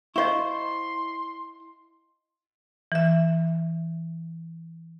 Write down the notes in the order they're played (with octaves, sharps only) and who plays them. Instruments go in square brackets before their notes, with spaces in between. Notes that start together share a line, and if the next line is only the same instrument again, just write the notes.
[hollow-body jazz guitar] E4 C5 [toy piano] D#5 F5 C#6 [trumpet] C6
[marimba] E3 E5